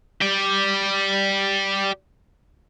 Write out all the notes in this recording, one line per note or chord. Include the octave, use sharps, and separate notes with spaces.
G4 D5